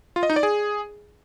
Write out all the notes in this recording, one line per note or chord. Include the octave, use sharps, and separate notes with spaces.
F4
D#5
D#4
D5
G#4